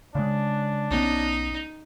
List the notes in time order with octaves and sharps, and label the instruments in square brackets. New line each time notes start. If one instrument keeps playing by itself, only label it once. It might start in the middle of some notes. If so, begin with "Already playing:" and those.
[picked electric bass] C#3 G#3 [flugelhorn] D4
[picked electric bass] B1 B3 [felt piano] C#4 [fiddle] D#4